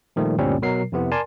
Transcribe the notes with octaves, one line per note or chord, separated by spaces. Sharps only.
A#2 D#3 F3 G3 A3
D2 G2 A#2 G3 C4 C#4
B2 F#3 A#4 C7
F2 C3 B3 E4
A#4 D5 G#5 A5 C6